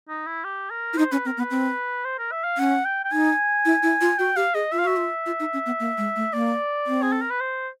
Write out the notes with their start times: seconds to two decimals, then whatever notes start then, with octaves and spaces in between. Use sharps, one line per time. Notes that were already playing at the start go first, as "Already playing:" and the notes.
0.09 D#4
0.27 E4
0.44 G4
0.71 A#4
0.93 E4
0.97 D#4 C5
1.11 C#4 B4
1.25 C4 A#4
1.37 B3
1.40 B4
1.51 C4
2.05 C5
2.19 A#4
2.32 E5
2.44 F5
2.58 C#4 F#5
2.85 G5
3.04 G5
3.12 D#4 G#5
3.65 E4
3.83 E4
4.01 F4
4.18 F#4 G5
4.36 G4 F5
4.54 G#4 D#5
4.72 F4 E5
4.80 F5
4.85 F#4 E5
4.97 F4
5.26 F4
5.40 D#4
5.53 C#4
5.66 B3
5.80 A#3
5.97 G#3
6.16 A3
6.33 A#3 D5
6.87 C4
7.02 G#4
7.12 A4
7.21 A#4
7.30 B4
7.40 C5